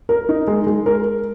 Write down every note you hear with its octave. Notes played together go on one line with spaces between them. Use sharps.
A#4
D#4
G#3
G#3
A#4